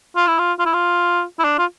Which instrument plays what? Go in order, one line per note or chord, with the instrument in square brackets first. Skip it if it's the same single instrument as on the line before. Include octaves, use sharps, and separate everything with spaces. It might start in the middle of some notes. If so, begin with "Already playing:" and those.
[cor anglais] F4
E4
F4
F4
E4
F4
E4
D4
F4